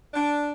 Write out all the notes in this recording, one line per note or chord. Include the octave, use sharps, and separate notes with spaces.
D4